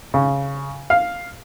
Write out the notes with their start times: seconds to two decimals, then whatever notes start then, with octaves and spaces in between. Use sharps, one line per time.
0.14 C#3
0.90 F5